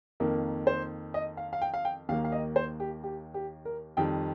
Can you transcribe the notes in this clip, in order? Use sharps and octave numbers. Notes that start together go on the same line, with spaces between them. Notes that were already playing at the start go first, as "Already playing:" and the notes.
F2 D#3 A#3 A#4
C5
D#5
F5
F5
G5
F5
G5
D#2 D#3 A#3 F5
F5
D#5
C5
G4
G4
G4
A#4
F2 D#3 G3 C4 G5